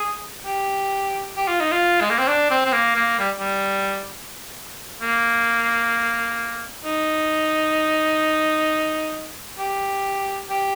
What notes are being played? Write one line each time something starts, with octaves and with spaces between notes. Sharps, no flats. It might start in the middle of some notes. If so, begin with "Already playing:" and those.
Already playing: G#4
G4
G4
F4
D#4
F4
G#3
A#3
C4
D4
C4
C4
A#3
A#3
G3
G3
A#3
D#4
G4
G4